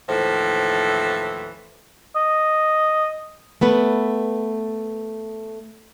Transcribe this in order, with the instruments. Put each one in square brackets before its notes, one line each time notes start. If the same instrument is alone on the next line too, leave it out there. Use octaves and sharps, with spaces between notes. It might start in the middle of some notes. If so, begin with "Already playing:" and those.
[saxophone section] D#2 A2 E3 F3 A4 C5
[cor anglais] D#5
[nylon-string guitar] A3 B3 B4